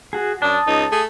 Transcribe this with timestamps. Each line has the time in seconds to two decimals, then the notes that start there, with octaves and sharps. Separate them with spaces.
0.13 F#4 G#4
0.42 F#2 D4 A5 D#6
0.67 C#2 D#4
0.92 A3 G#4